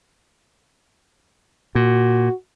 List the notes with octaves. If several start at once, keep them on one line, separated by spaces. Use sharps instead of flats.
A#2 F#4